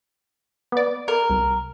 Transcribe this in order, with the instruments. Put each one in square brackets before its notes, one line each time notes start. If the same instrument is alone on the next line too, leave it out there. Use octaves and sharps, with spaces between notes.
[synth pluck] B3 D5
[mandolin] A#4
[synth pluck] C2